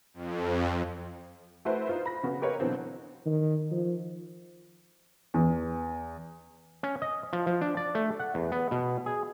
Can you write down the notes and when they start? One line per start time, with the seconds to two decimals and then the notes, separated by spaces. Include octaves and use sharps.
0.14 F2
1.65 A3 E4 F#4 B4 C5 E5
1.87 D#4 F4 C5
2.06 B5 A#6
2.23 C#3 B3 F#4
2.42 G4 A#4 B4 C#5 D#5 F5
2.60 B2 D3 E3 F#3 C4
3.26 D#3
3.71 F3
5.34 E2
6.83 C#4
7.02 D#5
7.33 F3
7.47 F3
7.61 D4
7.77 D5
7.95 A3
8.20 F#5
8.35 E2
8.52 B3
8.71 B2
9.06 G#4